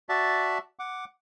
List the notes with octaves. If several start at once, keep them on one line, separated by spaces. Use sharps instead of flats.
F#4 D5 E5 A5
F#5 D6